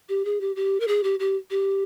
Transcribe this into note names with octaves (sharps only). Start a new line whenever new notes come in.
G4
G#4
G4
G4
A#4
G#4
G4
G4
G4